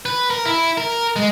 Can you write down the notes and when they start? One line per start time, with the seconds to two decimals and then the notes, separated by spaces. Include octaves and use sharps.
0.06 B4
0.30 A#4
0.46 E4
0.78 A#4
1.16 G#3